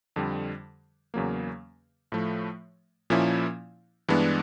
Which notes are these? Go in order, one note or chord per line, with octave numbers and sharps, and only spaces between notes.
F2 D3 G3
E2 C#3 F#3 A#3
A2 F3 A3
A#2 F3 A#3 C#4 E4
G2 E3 G#3 B3 D4